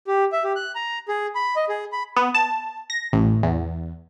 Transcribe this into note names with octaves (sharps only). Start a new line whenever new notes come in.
G4
E5
G4
F#6
A#5
G#4
B5
D#5
G#4
B5
B3
A5
A#6
A1
E2